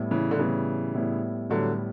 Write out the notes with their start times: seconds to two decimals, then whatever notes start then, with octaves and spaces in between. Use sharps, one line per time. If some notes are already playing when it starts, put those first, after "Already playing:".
Already playing: A2 G3 B3 E4
0.11 C#3 E3
0.31 D3
0.39 A2 C#3 E3 G3 B3 E4
0.94 A2 G3 B3 E4
1.50 A2 D3 F#3 G3 B3 E4